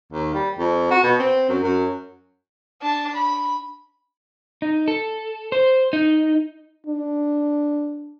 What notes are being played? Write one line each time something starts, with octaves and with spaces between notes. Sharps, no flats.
D#2
G3
F2
F#4
B2
C4
F#2
F#2
D4 A5
B5
D#4
A4
C5
D#4
D4